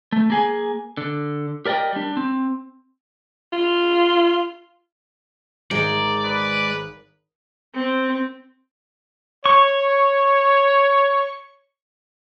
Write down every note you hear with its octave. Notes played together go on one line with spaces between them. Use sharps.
A3
A#3 G#4 G#5
D3
G4 A#4 D5 D#5 G5
G3 D4
C4
F4
G#1 G#3 D5 A#5 G6
B4 D#6 D7 D#7
C4
C#5 C#6